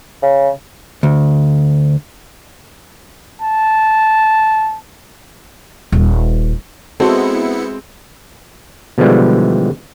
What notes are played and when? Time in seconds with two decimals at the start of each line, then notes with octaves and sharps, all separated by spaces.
0.23 C#3
1.03 D2
3.42 A5
5.92 D#1
7.00 G#3 B3 C4 E4 F#4 A4 C#7
8.98 B2 D3 E3 F3 G3 G#3